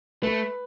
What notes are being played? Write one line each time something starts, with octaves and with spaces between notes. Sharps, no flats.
A3 B4